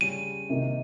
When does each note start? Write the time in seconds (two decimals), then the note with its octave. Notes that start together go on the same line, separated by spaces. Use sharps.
0.01 C#3 G3 C#4 D#7
0.50 C3 D#3 A#3 D#4